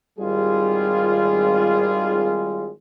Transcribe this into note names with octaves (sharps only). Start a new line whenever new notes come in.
G#1 G3 F4 G#4